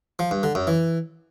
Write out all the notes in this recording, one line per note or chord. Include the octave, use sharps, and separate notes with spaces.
F3
G2
D3
F#2
E3